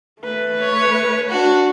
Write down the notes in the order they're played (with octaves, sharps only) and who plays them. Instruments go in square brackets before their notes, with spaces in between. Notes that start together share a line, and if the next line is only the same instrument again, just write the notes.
[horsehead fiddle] A3 B4
[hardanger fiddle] C#5
D4 F#4